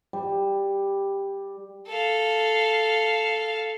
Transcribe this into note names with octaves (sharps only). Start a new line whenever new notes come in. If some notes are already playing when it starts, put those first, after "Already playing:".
G3
A4 F5